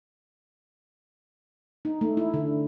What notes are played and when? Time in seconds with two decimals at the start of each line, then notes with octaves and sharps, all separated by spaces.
1.85 D#4
2.01 A3
2.17 E4
2.34 D3